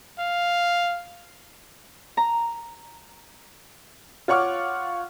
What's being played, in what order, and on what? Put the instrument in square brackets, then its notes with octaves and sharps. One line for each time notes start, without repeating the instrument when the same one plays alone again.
[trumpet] F5
[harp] A#5
[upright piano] F4 C#5 F#5 C#6 D6 F6